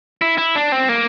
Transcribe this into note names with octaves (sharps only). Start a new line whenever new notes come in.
E4
E4
D4
C4
A#3